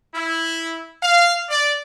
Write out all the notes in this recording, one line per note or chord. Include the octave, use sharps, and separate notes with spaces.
E4
F5
D5